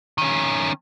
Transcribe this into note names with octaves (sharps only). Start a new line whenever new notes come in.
D#3 C#4